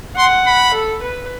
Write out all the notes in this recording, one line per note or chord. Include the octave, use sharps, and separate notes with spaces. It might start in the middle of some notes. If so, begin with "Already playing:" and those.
F#5 C6
B5
A4
B4